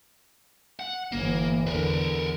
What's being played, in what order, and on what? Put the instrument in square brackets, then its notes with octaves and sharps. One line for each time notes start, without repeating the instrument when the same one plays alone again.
[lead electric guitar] F#5
[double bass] G1 E3 [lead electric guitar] A#3
[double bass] E2 D3 [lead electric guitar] A#4 B4